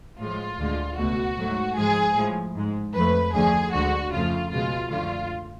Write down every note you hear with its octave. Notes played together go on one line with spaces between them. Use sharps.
A2 F3 G#3 F4
D2 D3 G#3
C#2 B2 A3 F#4
G#2 F#3 A3
G#2 F3 G#3 G#4
A2 F3 G#3
G#2 G#3
F2 F3 A3 B4
D2 D3 F3 A3 G#4
D2 D3 G#3 F#4
F2 C#3 F3 A3 F4
C#2 B2 G#3 F4
F#2 D3 F3 A3 F4